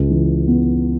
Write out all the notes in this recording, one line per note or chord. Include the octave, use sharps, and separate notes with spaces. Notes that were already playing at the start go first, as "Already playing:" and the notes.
Already playing: C#2
E3
B3